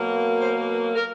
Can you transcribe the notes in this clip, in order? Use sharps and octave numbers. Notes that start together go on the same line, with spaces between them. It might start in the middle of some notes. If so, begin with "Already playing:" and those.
Already playing: B2 F#3 A#3
C5
B4
A#4